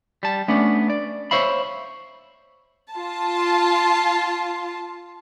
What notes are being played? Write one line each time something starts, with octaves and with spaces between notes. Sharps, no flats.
G3 A5
A3 B3 C#4 D4
D5
C5 C#5 E5 F5 B5
F4 A5